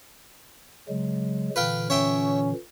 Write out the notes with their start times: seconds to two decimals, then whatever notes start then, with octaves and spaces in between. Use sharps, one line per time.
0.89 C#3 F#3 G#3
1.56 A#2 D3 E3 B4 F5 G5
1.90 C#4 C#5 E5 G5